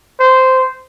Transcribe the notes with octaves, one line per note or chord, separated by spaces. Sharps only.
C5